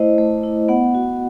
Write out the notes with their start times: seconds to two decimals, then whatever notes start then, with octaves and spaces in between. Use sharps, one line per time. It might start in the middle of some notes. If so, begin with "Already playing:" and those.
Already playing: A3 E4 C5 D#5
0.18 A3
0.43 E4
0.68 B3 F#5
0.95 F#4